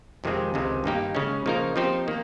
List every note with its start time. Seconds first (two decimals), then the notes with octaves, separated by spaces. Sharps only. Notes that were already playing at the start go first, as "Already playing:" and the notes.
0.24 F2 C3 D#3 G#3 C4
0.54 C#2 C3 D#3 G#3
0.84 G2 D#3 A#3 D#4 G4
1.15 C#3 G#3 C#4
1.46 C#3 F3 A#3 D#4 A#4
1.76 F3 C4 D#4 G4 C5
2.08 D#3 A#3